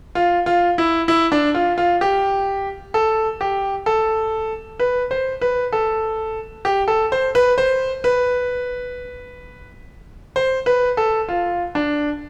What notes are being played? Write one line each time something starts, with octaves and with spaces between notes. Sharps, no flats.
F4
F4
E4
E4
D4
F4
F4
G4
A4
G4
A4
B4
C5
B4
A4
G4
A4
C5
B4
C5
B4
C5
B4
A4
F4
D4